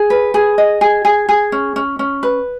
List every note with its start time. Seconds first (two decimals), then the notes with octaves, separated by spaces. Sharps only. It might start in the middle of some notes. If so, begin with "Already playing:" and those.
Already playing: G#4
0.10 B4
0.34 G#4
0.58 D#5
0.81 G#4
1.05 G#4
1.29 G#4
1.52 C#4
1.76 C#4
1.99 C#4
2.23 B4